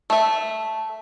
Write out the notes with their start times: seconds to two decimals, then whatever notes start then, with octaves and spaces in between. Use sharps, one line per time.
0.10 A3 E5